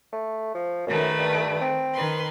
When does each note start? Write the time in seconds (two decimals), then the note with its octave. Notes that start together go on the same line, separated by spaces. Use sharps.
0.13 A3
0.55 F3
0.87 F#2 D#3 A3 B4
1.18 G2
1.61 C4
1.94 D#3 B4 C6